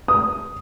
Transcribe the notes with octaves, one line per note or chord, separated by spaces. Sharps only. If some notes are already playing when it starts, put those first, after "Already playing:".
D#6